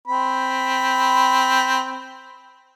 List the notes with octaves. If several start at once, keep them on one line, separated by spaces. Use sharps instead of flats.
C4 B5